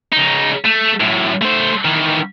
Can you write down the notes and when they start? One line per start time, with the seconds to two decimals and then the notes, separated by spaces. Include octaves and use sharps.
0.13 C#3 D#4
0.65 A3
1.01 F#2 A2
1.42 A3 C5
1.85 D#3 E3